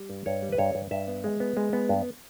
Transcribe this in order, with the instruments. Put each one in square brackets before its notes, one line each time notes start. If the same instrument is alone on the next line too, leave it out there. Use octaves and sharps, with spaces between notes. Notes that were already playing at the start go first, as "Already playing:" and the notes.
Already playing: [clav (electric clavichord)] G3
G2
G2 C#5
G3
B4
G2 C#5
G2
G2 E5
B3
G#3
B3
G#3
B3
G2